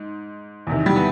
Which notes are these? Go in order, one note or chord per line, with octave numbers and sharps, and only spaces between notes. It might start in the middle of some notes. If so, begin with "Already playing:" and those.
Already playing: G#2
E2 C3 D#3
G3
B3